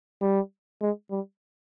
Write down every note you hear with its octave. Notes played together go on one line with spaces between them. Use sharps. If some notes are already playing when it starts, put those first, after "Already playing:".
G3
G#3
G3